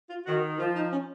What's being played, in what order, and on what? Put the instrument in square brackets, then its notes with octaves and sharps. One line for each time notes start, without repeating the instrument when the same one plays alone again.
[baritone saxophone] F4
[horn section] D#3 [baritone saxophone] F#4
[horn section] F3 [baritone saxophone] F4
[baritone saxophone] D#4
C#4